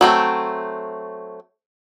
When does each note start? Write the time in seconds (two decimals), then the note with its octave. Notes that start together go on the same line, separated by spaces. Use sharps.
0.01 F#3 A3 C4